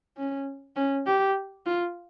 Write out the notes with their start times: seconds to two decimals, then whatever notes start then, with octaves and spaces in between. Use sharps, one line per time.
0.18 C#4
0.76 C#4
1.07 G4
1.66 F4